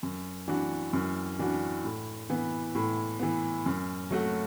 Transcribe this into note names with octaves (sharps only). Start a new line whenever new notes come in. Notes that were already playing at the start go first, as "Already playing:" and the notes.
F#2
E3 D4 F#4
F#2
E3 D4 F#4
A2
E3 B3
A2
E3 B3
F#2
F#3 A3 F#4